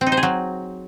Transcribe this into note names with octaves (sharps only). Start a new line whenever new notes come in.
C4
D#4
C5
G#4
F#3